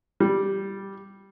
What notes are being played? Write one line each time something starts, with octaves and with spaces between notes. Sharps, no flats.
G3